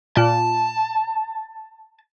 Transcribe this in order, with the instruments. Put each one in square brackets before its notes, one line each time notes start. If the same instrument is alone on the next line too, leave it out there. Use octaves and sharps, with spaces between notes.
[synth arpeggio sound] A#2 [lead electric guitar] A5